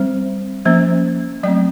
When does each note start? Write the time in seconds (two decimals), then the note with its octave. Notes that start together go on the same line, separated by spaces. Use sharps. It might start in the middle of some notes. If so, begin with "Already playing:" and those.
Already playing: G3 C4 C5
0.65 F3 A#3 C#4 C5
1.43 F#3 A3 C4 D5